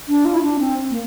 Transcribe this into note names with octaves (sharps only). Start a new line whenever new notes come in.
D4
F4
E4
D4
C4
A#3